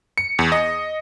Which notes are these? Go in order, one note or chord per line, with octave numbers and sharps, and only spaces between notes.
C#7
E2
D#5